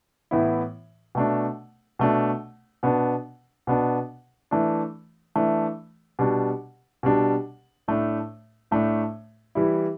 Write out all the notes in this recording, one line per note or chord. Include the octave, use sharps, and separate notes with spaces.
A2 E3 B3 E4
B2 A3 D4
B2 A3 D4
B2 B3 D4
B2 B3 D4
E3 A3 D4
E3 A3 D4
B2 G3 D4
B2 G3 D4
A2 A3 D4
A2 A3 D4
E3 G3 E4